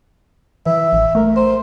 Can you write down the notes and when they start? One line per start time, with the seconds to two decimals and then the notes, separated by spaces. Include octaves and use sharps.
0.66 E3 E5
0.93 A1
1.15 A3 A#4
1.36 C5